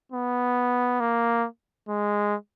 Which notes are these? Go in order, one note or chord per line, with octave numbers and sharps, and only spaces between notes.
B3
A#3
G#3